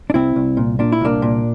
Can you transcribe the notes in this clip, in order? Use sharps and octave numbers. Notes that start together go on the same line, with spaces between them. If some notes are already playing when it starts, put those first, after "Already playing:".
D4
C2 C4 E4
C2
A#2
A#2 D4
E4
C2 A#3 D4
A#2